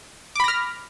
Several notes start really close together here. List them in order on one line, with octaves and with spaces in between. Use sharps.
D6 B5 A#6 F6